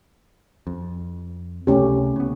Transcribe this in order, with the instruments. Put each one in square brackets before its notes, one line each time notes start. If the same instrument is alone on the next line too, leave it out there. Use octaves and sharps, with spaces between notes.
[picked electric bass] F2
[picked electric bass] C#2 C3 [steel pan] A3 C#4 G4
[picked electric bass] C#3 B3